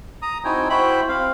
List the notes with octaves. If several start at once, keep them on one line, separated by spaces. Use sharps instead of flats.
A#5 D#6
C4 D#4 E4 F#4 G5 G#5
E4 F#4 C5 G5 B5
C4 F5